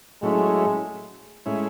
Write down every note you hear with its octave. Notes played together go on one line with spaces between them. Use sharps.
A2 F#3 G#3 A3 C#4 E4
A2 G#3 C#4 E4